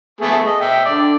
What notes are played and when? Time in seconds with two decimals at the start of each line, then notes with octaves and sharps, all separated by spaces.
0.21 A3 B3 G#4
0.46 D#5
0.61 E5 G5
0.86 D3 D5